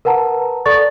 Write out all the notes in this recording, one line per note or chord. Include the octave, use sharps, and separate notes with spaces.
A#4 B4 F#5 A5 A#5
A4 D5 C#6 A6